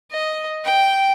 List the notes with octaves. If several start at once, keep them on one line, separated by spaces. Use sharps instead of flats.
D#5
G5